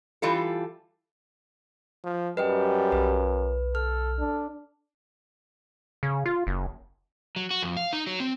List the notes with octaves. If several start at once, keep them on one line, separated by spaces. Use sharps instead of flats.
E3 G3 F4 A4
F3
F#2 G3 B4 D#5 G5
B1 B4
A4 F6
D4 A4
C#3
F4
F#1
F#3
F#4
F2
F5
D#4
F#3
C4